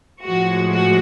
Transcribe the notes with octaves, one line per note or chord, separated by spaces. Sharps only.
A2 F3 G#3 F#4
F#4